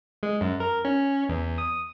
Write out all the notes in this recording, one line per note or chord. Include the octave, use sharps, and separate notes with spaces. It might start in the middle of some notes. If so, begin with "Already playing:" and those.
G#3
F#2
A#4
C#4
E2
D#6